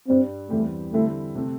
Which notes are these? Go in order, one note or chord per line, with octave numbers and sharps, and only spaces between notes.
G2 G3 C4 D4
E2 E3 G3 A3 C4 G4
D3 G3 A3 C4 E4 A4
C3 A3 C4 A4